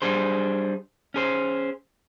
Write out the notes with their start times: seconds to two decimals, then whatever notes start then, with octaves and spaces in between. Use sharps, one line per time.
0.02 G3 D4 G#4 C5
1.14 C#4 G#4 C5